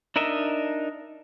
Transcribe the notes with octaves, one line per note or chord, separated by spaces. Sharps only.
D4 D#4 A#4 D#5 E5